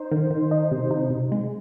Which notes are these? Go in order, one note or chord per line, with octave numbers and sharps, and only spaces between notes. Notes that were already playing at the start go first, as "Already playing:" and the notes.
Already playing: D#4 C5
D#3
D#3
D#4
C3
D#4
C3
G#3